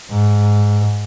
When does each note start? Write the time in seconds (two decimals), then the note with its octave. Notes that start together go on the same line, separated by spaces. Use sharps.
0.10 G#2